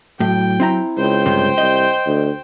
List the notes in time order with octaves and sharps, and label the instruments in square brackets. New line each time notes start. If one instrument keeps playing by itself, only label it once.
[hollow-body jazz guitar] A2 [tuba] F#3 [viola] G5
[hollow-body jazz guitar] C4 E4 A#5
[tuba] C#2 [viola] C5 G5
[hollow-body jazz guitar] G2 C3
[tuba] C2 [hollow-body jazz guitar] D#5
[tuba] D2